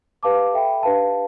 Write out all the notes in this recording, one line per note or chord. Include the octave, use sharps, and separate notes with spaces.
G4 B4 F5 A5 D6
A4 E5 G5 B5
D4 G4 B4 F5 A5